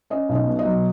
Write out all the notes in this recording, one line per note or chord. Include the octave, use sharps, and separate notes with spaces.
C#4 D#5
B1
D#5
B2
D#5
F#3